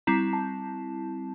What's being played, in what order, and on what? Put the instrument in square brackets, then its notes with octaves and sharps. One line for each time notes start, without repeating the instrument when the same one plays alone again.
[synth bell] G3 C4 E4 A#5
A5